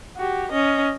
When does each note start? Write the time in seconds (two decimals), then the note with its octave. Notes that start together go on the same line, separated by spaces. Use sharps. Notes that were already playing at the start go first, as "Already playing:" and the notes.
0.16 F#4 G4
0.52 C#4 D#5